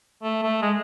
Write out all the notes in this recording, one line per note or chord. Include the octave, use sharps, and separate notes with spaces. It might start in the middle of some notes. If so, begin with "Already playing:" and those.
A3
A3
G#3